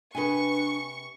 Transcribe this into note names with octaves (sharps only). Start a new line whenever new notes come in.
C3 D4 G#4 B4 G#5 C#6